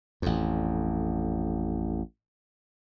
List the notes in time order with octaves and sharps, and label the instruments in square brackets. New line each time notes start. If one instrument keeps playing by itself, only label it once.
[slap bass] A1 F2